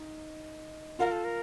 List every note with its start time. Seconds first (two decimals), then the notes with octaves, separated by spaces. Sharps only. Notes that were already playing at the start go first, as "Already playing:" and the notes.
Already playing: D#4
0.99 F4 A#4 F5
1.12 A4
1.24 A#4